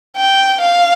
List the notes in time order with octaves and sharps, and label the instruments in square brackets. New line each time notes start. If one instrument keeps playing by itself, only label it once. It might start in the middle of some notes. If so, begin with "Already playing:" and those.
[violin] G5
F5